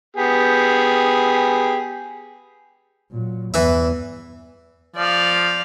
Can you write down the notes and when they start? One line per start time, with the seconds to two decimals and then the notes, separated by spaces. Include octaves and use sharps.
0.17 B3 G4 G#4
3.11 A#2 F#3
3.54 E2 G2 E3 E4
4.96 F3 D5 F5